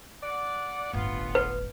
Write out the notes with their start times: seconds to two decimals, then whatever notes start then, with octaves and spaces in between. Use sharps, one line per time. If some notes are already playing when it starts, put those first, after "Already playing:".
0.23 D5 F#5
0.93 D1 G1 B3 F4
1.35 B4